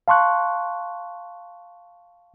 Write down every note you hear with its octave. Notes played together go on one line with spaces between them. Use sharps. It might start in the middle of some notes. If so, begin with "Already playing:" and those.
F5 A5 C6 C#6 F#6